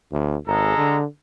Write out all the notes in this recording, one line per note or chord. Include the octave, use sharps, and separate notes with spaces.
D2
G#1 G#3 A4 A#5
D3